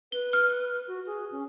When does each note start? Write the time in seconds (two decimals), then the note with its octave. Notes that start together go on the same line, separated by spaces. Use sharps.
0.12 B4 G7
0.33 F6
0.88 F#4
1.06 G#4
1.32 C#4